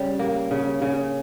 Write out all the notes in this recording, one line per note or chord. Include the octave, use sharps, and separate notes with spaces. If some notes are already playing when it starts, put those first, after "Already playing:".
Already playing: C#3 G3 C#4
A#3
C#3
C#3